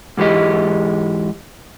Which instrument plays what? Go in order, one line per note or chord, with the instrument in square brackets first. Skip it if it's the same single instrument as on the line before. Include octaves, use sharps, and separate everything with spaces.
[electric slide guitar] G#2 E3 G#3 G4 D#5